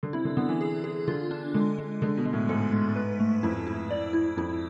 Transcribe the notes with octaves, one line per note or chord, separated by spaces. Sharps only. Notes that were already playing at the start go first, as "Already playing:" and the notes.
D3
C3 E4
D3
D3 B3
E3
G#4
G#4
D3 F4
D4
D3 G#3
G#3
D3 G#3
B2
G#3
A2
G#2 A4
G#3
B4
A3
F2 E4
E4
D5
E4
F2 E4